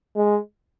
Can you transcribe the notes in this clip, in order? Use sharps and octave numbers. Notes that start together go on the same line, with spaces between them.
G#3